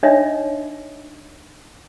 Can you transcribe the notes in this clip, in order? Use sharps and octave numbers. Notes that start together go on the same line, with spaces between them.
D4 D#4 C#5 D#5 E5